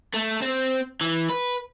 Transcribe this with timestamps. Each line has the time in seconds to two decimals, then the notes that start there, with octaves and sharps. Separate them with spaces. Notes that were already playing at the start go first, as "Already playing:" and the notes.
0.14 A3
0.42 C4
1.01 E3
1.29 B4